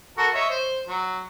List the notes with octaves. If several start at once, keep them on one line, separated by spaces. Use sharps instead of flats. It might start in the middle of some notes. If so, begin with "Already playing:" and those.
F#4 A4 A#4
C#5 D#5 E5
C5
F#3